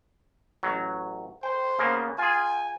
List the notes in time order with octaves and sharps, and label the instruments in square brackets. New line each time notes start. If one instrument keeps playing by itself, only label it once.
[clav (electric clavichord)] A1 F#3
[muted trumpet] C5 [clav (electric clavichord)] G5
[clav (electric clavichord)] C#3 A#3 B3
[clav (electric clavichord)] F4 G#4 [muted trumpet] G#5